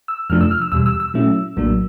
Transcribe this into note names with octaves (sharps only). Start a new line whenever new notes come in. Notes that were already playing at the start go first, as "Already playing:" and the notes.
E6
F2 C3 F3 A3 D4 F6
E6
F6
E6
E2 B2 G3 E6
E6
E6
A#2 F#3 A3 C#4 E4
A#1 A2 F#3 A#3 D4